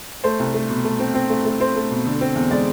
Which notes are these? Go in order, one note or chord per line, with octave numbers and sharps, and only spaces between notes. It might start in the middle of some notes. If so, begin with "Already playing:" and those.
A3 C5
C2
A3
B2
A3
C4
C4
A3
A3
C4 C5
A3
B2
D3
C4
E2
G#3 D5